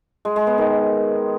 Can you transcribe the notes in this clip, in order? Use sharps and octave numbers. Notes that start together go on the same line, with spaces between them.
G#3
G#3
B3
D#3